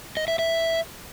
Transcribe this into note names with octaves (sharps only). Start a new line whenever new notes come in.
D#5
E5
E5